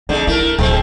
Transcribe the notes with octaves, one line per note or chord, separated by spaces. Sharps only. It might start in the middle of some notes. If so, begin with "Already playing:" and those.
D3 G#3 C4 D#4
A3 E4 A#4
D1 G#3 A3 C4